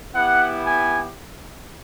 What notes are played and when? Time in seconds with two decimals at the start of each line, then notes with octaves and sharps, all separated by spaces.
0.14 B3 E4 G4 F#5
0.64 G#5